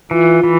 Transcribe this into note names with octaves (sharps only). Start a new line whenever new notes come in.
E3 F4
E3